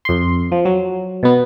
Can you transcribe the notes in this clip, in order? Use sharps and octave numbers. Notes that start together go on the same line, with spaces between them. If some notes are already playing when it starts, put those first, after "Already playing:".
F2 C6
F3
F#3
B2 B3